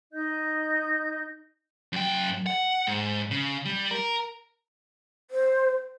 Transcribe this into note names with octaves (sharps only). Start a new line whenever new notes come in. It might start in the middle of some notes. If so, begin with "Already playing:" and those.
D#4 D#5 G6
F#2 G5
F#5
G#2
C#3
G3
A#4
C5